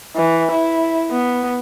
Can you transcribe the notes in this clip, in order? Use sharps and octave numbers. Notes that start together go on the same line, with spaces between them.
E3
E4
B3